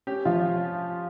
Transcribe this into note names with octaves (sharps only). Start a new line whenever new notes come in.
C#4 G4
F3 F4